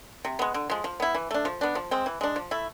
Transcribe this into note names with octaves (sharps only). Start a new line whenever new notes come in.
C3
G#3 B3
D3
F3 G#3
F3
B3 E4
E3
A3 D4
F3
B3 D4
F3
G#3 C4
E3
G#3 D4
F3
A3 E4